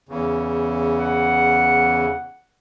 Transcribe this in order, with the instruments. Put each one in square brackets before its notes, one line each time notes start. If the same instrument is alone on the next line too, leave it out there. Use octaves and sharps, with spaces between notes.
[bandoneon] E2 C#3
[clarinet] F#5